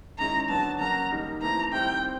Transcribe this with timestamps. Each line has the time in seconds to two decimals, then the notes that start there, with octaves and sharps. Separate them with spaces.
0.18 D#3 G#3 C#4 E4 A#5
0.49 D3 F#3 B3 D4 A5
0.80 C#3 F#3 A#3 A#5
1.10 D#3 G3 A#3 D#4
1.42 E3 A3 C4 E4 A#5
1.72 D#3 G3 C4 E4 G5
2.03 C4